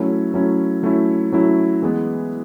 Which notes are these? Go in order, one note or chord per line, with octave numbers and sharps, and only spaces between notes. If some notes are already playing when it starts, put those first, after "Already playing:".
Already playing: F#3 A3 C#4 E4
F#3 A3 C#4 E4
F#3 A3 C#4 E4
F#3 A3 C#4 E4
E3 G#3 B3